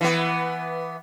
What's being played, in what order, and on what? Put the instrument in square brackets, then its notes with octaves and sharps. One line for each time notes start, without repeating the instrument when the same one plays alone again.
[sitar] E3 B3